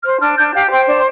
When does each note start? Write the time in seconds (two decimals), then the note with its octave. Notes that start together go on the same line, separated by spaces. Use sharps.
0.04 C5 F6
0.20 D4 F6
0.37 D4 G6
0.54 G4 F5
0.71 C5 G5
0.88 D4